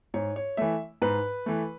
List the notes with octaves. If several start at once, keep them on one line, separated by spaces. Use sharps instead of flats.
G#2 C#5
C#5
E3 A3 E5
G#2 B4
E3 A3